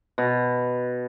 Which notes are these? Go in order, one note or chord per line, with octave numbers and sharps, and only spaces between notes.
B2